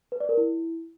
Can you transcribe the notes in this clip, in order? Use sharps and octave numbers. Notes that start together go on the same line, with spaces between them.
B4
D5
A#4
E4